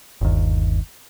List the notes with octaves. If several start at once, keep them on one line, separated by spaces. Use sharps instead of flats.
G1 D#2